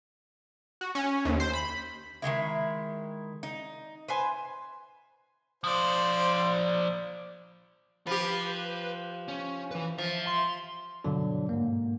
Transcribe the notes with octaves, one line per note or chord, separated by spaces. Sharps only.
F#4
C#4
D#2
C5
B5
D#3 E3 G#3 E4
D#4
B4 C5 G#5
F3 F4 C5 D5
F3 G4 B4
C#4
E3 B4
F3 E5
C6
G2 B2 D3 F#3 D4
G#2 A#3